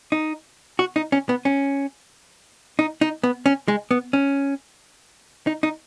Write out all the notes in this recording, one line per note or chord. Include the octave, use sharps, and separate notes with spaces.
D#4
F#4
D#4
C#4
B3
C#4
D#4
D#4
B3
C#4
G#3
B3
C#4
D#4
D#4